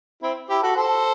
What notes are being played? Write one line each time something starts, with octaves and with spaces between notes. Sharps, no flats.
C4 E4
E4 G4
F#4 A4
A4 C5